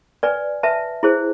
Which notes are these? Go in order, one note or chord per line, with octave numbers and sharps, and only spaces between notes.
B4 D5 G#5
B4 E5 A5
E4 G#4 C5